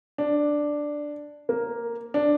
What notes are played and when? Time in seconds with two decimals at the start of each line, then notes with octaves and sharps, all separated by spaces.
0.18 D4
1.49 A#3
2.14 D4